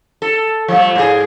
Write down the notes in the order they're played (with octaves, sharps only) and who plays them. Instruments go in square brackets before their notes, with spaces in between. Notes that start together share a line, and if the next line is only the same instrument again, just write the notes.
[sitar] A4
F3 G3 A3
G#2 G#4